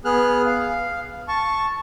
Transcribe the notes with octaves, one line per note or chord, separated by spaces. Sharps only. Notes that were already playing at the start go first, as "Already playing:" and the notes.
B3 G#4 F6 F#6
F5
A5 C#6